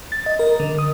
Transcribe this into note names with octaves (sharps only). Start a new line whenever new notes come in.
A6
D#5
A#4
D3
D#6